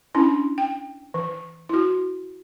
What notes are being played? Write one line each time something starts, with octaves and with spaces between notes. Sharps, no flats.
C#4 D4 E4
G5
E3
E4 F#4